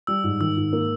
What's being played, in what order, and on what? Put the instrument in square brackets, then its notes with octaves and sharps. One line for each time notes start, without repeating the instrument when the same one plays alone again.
[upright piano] G3 [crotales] E6
[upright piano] G#2
[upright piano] D#3 [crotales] E6
[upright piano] G#2
A#3